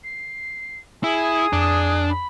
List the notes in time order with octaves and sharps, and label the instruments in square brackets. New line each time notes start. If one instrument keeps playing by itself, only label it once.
[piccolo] C7
[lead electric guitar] E4 [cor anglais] G#4 [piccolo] D#6
[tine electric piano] F2 [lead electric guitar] D4
[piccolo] B5